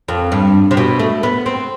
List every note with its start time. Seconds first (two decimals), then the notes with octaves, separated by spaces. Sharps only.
0.08 F2
0.32 G2
0.71 C3
0.77 B2
0.99 A3
1.23 B3
1.46 C4